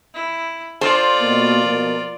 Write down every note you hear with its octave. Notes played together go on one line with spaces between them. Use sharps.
E4
F4 A4 C5 D5
B2 A#3
B2 F3 A#3